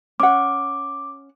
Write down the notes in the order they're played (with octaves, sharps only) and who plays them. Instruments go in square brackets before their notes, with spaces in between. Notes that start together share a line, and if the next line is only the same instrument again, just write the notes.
[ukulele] C#4 F#5 [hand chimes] D6